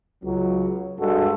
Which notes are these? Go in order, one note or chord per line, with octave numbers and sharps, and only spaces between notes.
C#2 F#3
G2 G#3 F#4 A4